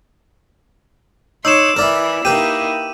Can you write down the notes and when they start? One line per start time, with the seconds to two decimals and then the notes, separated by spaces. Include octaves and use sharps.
1.45 D#4 C#5 C6 D6 E6 E7
1.77 E3 E4 A#4 D5 E5
2.25 A#3 D#4 E4 G4 B4 D#7